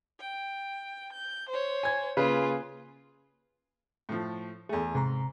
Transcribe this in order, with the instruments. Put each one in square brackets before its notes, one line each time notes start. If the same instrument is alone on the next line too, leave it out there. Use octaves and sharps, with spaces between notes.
[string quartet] G5
G6
C5 C#5
[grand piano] G#5 G#6
[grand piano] C#3 B4 [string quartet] A#3 F4 G#4
[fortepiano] A2 F3
[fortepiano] E2 A3 [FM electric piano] G#4
[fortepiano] G#2 [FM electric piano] C3 A#5